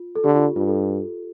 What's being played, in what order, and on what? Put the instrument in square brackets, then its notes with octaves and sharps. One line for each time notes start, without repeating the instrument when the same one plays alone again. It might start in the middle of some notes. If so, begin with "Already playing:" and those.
Already playing: [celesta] F4
A4
[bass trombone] D3 [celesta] G4
[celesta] F4
F4
[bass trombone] G2 [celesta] F4
[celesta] A4